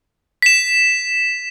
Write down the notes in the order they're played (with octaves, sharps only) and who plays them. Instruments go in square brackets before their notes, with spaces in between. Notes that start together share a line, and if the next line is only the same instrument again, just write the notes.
[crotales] B6 E7